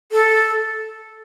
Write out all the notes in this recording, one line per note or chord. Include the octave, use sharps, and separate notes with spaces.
A4